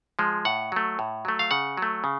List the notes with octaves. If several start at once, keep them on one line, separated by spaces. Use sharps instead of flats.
F3 G#3
A2 F#5
F#3 A3
A2
F#3 A3
F5
C#3 F#5
F#3 A3
C#3